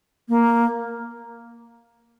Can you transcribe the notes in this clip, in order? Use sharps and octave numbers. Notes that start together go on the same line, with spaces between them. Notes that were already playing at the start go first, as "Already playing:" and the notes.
A#3